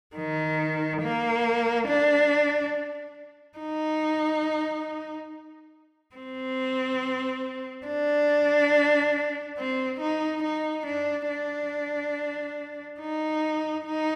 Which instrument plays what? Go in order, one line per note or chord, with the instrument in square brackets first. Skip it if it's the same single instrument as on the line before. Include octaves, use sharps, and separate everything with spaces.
[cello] D#3
A#3
D4
D#4
C4
D4
C4
D#4
D#4
D4
D4
D#4
D#4